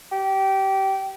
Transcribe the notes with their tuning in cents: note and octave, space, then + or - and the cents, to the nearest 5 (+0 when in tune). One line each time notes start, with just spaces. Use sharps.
G4 -20